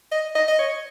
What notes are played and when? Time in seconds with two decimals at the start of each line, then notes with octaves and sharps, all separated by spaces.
0.12 D#5
0.35 D#5
0.48 D#5
0.59 C#5